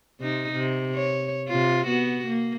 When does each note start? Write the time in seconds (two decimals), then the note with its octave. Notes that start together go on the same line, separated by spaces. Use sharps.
0.20 C3 D#4
0.53 C3
0.95 C#5
1.48 C3 F4
1.87 B3 F#4
2.27 A#3